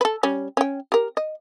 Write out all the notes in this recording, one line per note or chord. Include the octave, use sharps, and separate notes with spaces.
A4 B4
G3 C#4
C#4 G5
G4 A#4
D#5